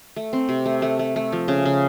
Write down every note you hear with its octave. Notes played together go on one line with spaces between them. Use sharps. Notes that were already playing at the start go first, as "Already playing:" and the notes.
A3
C4
C3
A3
A3
A3
A3
F3
C#3
C#3